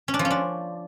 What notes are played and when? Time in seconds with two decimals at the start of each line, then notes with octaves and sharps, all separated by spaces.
0.08 C#4
0.14 D4
0.19 F3
0.25 C#4
0.30 D4